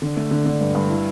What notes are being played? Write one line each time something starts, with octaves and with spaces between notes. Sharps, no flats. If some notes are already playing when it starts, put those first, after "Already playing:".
D3
A3
D3
D3
G2
G2
E4